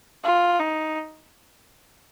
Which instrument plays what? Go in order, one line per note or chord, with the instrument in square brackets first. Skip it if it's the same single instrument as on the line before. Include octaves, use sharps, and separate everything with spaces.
[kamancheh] F4
D#4